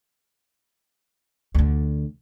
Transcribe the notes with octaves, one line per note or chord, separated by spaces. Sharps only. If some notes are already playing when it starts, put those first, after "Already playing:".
D2 D3